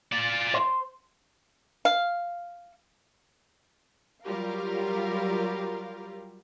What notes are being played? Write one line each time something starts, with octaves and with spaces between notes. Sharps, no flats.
F4 D5
C5
F5
F#3 G3 F4 G4 A#4 F5